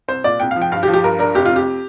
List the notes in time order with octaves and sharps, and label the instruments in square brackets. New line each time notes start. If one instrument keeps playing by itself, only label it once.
[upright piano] C2 C5
A#2 D5
C2 G5
F5
F3
G5
G2 F5
G4
F3
G4
G2 A#4
D4 A#4
F1 G4
F4
F2 G4